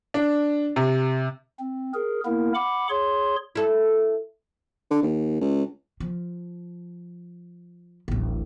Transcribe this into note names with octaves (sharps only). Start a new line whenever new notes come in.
D4
C3
C4
G#4 A#4
A#3 B3 E4 A#4
F#5 B5 D6
G#4 C#5 C6
E4 A4
D3
D#2
C#2
F3
D1 A1